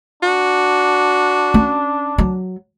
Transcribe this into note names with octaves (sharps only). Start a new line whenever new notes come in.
D4 F#4
C#4
F#3